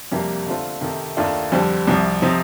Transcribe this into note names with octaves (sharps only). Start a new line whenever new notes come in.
F2 C3 G3 A#3
D3 A3 C4 F4
C3 D#3 A3
D#2 D#3 A3 D4 F4
F2 D3 G3 C4
C2 C3 F3
C3 F3 C4 D#4